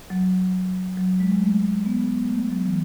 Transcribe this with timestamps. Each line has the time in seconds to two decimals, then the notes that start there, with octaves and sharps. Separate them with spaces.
0.10 F#3
0.97 F#3
1.20 G#3
1.31 G#3
1.41 A3
1.86 B3
2.29 A3
2.50 F#3
2.66 E3